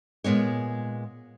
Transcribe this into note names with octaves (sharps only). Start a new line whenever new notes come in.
A#2 G#3 B3 C#5